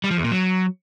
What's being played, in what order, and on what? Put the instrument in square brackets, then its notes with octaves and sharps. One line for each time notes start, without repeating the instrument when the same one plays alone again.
[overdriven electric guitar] G3
F3
E2
A#2
F#3